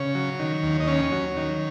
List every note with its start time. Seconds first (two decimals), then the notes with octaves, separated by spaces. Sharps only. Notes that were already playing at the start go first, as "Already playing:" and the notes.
Already playing: C#3 C#5
0.15 F#3
0.39 D#3
0.63 D#2
0.80 D#5
0.87 C#4 C#5
1.12 F#3
1.37 D#3